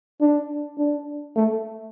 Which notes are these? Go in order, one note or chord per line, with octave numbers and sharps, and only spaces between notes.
D4
D4
A3